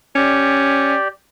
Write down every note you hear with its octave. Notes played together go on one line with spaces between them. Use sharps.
C#4 G4 D5